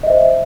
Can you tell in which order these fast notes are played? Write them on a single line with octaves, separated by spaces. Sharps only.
D#5 E5 C5